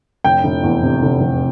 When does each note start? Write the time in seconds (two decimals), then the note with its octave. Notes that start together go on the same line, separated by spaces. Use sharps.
0.24 F1 G5
0.44 F1
0.63 E2
0.83 C3
1.02 F1
1.21 F1